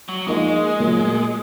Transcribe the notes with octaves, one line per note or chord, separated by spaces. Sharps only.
F#3
F3 G#3 A#3 D#4
A#2 F#3 A#3